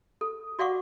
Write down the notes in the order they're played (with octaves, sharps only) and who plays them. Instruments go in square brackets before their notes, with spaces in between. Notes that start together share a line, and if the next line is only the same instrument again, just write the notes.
[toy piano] A4
F#4 D5 F5 F#5 C#6 D6